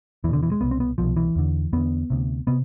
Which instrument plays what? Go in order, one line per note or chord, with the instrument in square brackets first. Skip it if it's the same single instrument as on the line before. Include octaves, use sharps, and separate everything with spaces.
[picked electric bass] E2 E3
B2 D3
E3
G#3
C2 B2 B3
C4
B3
C2 B2 F3
E3
E2 D3
E2 D3 B3
D2 C3
C3 B3